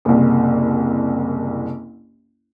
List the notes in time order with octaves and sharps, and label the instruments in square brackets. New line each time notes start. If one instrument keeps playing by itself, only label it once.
[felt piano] F#1 C2